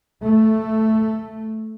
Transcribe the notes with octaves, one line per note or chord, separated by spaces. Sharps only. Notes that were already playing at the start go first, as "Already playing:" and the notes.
A3